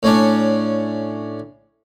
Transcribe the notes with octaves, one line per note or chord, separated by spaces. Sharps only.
A2 C#4 D4